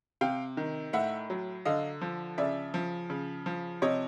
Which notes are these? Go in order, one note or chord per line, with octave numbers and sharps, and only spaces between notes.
C3 F5 G5
D#3
A2 E5 F#5
F#3
D3 D#5 F5
F3
C#3 D5 E5
F3
C#3
F3
C3 C#5 D#5